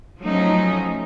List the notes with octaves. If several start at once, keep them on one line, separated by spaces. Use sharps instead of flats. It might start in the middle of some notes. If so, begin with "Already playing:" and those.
F3 F#3 A3 C#4 D#4